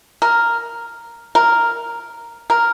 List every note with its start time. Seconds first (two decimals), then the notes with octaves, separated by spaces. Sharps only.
0.22 A#4
1.35 A#4
2.50 A#4